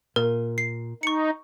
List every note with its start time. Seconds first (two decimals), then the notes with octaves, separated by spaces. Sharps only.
0.16 A#2 A#4
0.58 C7
1.03 D#4 C#6 C#7